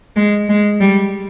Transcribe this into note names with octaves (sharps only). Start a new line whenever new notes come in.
G#3
G#3
G3